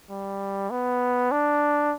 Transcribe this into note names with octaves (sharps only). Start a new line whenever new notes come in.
G3
B3
D4